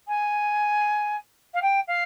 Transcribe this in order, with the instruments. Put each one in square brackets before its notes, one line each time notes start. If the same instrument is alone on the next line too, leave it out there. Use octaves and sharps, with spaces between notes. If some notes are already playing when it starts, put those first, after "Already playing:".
[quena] G#5
F5
G5
F5